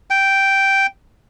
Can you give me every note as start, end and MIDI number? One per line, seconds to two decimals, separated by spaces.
0.10 0.86 79